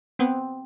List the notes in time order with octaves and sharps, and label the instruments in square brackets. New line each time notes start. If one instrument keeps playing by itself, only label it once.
[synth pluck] B3 [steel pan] C4